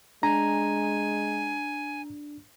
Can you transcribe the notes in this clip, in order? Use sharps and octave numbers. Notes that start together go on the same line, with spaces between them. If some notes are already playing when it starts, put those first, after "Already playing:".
G#3 D4 G#5 A#5